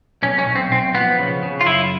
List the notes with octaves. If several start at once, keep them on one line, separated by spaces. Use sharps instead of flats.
B1 C#4
C#4
B1
C4
B1 C4
F3 B3
C#3
C#3
F4
F#2 E4